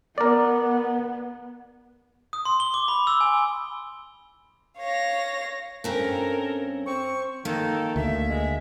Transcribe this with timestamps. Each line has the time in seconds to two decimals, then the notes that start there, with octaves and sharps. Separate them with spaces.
0.18 B3 A#4 D5
2.33 D#6
2.45 C6
2.60 G7
2.74 D6
2.88 B5
3.07 E6
3.21 G#5
4.78 C#5 F5 A#6
5.84 G2 C4 C#4 A4 A#4
6.86 C4 C#6
7.45 D#3 A#3 A4
7.96 D2 E5
8.30 G#3